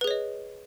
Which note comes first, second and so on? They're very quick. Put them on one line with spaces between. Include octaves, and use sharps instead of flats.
B4 G#4 C#5 D#5